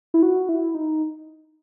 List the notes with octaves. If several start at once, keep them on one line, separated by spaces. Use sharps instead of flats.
E4
F#4
E4
D#4